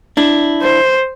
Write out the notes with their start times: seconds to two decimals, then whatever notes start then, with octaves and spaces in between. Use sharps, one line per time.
0.17 D4 E4
0.62 C5